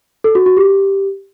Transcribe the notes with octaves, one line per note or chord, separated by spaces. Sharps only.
A4
F#4
F#4
G4